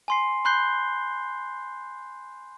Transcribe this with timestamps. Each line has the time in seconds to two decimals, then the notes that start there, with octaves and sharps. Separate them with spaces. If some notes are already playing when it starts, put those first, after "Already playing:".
0.08 G#5 C6 C7
0.45 B5 C6 F#6 G6 C7 G7